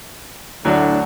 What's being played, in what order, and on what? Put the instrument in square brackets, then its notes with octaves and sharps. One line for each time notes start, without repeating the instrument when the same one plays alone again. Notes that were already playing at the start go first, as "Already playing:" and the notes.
[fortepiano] D2 F#3 F#4 [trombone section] A2 D3 D4